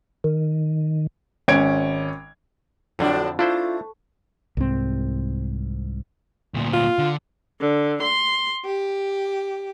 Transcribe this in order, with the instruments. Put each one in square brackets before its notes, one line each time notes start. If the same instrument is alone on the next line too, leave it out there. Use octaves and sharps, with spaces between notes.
[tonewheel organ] D#3
[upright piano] G#1 C#4 G#6 D7
[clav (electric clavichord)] F2 D3 [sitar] A2 F#3 D4
[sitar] A3 [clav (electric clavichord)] D4 E4 C5 [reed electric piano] F4
[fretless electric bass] C2 G#2 C4
[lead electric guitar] D2 A#2
[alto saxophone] F4
[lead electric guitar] D3
[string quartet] D3
C6
G4